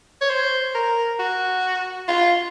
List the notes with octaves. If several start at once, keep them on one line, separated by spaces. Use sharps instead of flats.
C#5
C5
A#4
F#4
F4